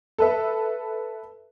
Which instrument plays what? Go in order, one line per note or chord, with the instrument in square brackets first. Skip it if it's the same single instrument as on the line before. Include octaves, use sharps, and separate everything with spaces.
[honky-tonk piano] A4 B4 E5